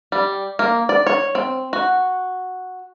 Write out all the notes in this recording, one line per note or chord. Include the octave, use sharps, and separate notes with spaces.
G3
A#3
D5
C#5
C4
F#4